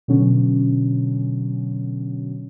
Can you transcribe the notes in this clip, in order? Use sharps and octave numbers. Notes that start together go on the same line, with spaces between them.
B2 D3 F#3 C#4